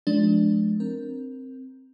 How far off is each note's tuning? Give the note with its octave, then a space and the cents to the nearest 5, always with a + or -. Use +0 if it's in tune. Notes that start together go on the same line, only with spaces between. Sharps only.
F3 +0 G#3 +30 D4 +0
C4 +0 A#4 +0